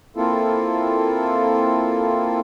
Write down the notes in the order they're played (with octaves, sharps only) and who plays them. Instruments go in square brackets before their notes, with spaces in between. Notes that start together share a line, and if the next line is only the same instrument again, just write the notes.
[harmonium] A#3 C4 E4 F4 A4